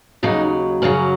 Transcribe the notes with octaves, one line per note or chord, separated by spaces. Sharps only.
D#2 C#3 F#3 D#4
F#2 C#3 F#3 C#4